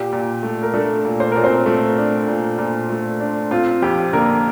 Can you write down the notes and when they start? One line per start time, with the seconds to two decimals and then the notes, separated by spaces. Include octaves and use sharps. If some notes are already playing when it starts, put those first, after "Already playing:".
Already playing: A#2 G4
0.13 A#2
0.43 A3
0.63 A#4
0.74 A3 D4 A4
1.05 A#2
1.20 C5
1.32 A#2 A#4
1.44 C4 C5
1.66 A3
1.98 D4
2.28 A#2
2.58 A#2
2.90 A3
3.20 D4
3.51 C4 F4
3.82 F2 G4
4.13 D3 A#3 A#4